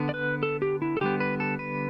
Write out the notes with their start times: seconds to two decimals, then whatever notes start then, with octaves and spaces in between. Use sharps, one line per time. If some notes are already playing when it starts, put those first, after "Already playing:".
Already playing: D3 B3
0.09 D5
0.14 B4
0.43 A4
0.62 G4
0.82 E4
0.97 A4
1.01 D3 G3 B3 G4
1.20 B4
1.40 A4
1.59 B4